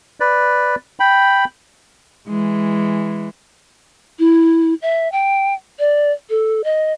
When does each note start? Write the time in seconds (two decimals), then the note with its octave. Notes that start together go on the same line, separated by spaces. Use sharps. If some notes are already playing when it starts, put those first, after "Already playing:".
0.20 B4 D5
1.00 G5 B5
2.27 E3 G#3
4.19 E4
4.82 E5
5.12 G5
5.79 D5
6.30 A4
6.64 D#5